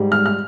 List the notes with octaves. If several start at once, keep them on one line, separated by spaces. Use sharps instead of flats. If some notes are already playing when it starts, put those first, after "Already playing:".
Already playing: G#2 G3
F6
F6